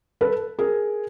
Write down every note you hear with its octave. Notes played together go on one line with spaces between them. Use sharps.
A4 B4
G#4 A#4